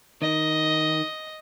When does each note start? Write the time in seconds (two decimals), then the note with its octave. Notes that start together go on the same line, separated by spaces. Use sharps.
0.22 D#3 D#5